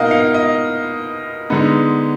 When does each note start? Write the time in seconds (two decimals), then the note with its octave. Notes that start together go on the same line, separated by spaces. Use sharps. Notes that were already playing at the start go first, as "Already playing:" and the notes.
Already playing: B2 A#3 D#4 D#5 F5 F#5
0.11 F5
0.34 D#5
1.50 D3 G#3 B3 D#4